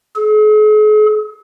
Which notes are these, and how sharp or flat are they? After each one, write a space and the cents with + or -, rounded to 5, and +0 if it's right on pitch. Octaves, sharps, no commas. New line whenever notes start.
G#4 +45